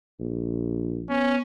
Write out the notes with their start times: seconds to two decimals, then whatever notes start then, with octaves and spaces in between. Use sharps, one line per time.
0.20 A#1
1.09 B3 C#4